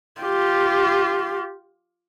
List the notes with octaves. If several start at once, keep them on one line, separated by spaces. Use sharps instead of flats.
F4 G4